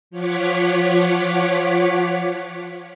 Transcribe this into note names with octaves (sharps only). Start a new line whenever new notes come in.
F3 F4 C#5 F#5 D6 B6